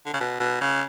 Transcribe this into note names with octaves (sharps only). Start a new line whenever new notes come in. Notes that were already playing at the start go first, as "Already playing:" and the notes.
D3
C#3
B2
B2
C#3